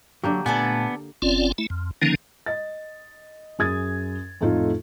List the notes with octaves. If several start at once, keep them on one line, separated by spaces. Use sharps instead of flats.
D3 F#3 A#3 G4
A#2 A3 B3 A4 D5 G#5 A5
F#1 C4 C#4 F4 D5
A3 E4
F2
D3 D#3 F3 A#3 C#4 D#4
D#5 A6
F#2 G#4 D#6 G#6 A6
F2 A2 A3 D#4 F4 A4